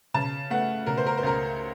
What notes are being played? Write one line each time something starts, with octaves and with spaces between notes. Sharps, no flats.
C#3 A5
A3 F#5
C#3 A#4
C5
A#4
C5
C#2 A#4